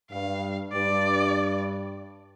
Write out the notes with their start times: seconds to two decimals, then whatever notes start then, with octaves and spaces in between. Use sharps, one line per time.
0.11 G2 F5
0.73 G2 D5